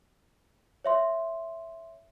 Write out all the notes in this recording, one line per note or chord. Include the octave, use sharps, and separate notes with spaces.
C#5 E5 C6